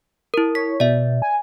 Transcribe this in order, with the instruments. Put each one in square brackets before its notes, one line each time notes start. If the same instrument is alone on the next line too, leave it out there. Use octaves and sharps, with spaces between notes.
[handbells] E4 A#4
[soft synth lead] C#5 [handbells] B6
[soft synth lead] B2 [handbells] D5 E5
[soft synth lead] G#5